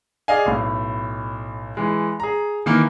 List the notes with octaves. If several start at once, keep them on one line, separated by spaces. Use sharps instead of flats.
G#4 D5 D#5 F5 G#5
B1 A2
E3 G#3
G#4 A#5
D#3 E3 A#3